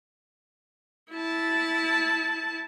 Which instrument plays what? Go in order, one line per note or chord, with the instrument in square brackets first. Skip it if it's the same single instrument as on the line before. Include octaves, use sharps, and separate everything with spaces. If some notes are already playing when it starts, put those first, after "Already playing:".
[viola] E4 A5